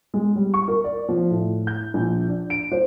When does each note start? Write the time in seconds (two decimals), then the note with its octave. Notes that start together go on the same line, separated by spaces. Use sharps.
0.14 G#3
0.36 G3
0.54 C#6
0.68 A#4
0.84 D5
1.09 F3
1.30 A2
1.67 G6
1.94 A#1
2.28 D4
2.50 D7
2.72 C5